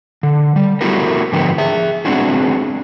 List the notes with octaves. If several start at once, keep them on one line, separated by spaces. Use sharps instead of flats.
D3
G3
A3 B3 E4 F#4 G4 A#4
G#2 D3 F3 B3 G4
G#4 E5
G#3 B3 C4 D4 F#4 G#4